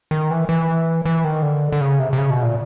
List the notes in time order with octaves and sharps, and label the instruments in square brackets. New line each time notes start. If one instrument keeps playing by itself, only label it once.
[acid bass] D#3
E3
E3
E3
D#3
D3
D3
C#3
C3
C3
C#3
B2
A#2